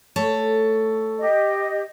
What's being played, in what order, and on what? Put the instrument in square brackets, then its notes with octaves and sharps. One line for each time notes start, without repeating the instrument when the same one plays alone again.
[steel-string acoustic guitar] A3 A4 C#5
[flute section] G4 D#5